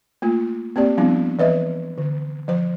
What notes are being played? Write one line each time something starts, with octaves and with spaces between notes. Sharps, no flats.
A3 A#3 F4
A#3 C4 G4 D5
F3 G3 B3 C4 D4 E4
E3 B4 D#5 E5
D3
F3 C5